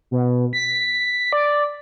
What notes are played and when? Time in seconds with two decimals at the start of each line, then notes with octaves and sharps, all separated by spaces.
0.11 B2
0.53 B6
1.33 D5